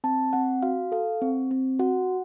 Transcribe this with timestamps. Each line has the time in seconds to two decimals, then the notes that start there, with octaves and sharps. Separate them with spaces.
0.04 C4 A5
0.33 C4 F#5
0.63 F#4 F5
0.92 A4 F5
1.22 C4
1.51 C4
1.79 F#4 F#5